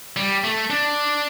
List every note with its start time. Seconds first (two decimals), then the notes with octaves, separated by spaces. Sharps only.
0.16 G3
0.44 A3
0.70 D4